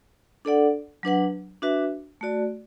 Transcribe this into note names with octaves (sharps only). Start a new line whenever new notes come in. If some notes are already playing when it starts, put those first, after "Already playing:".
D4 A4 D5 F#5
F#3 D4 B4 F#5
D4 F#4 B4 E5
A3 F#4 D5